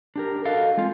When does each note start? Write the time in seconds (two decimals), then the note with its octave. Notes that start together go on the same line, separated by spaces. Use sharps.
0.16 D4 G4 A#4
0.45 F#4 A4 D#5 F5
0.77 G#3 C4 F4